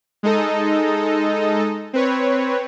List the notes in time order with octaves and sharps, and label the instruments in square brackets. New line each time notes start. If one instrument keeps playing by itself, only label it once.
[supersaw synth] G#3 D#4 A4 D#5
C4 B4 C#5